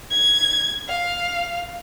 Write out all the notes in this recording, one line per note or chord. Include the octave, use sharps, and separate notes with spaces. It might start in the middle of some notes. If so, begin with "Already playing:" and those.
G#6
F5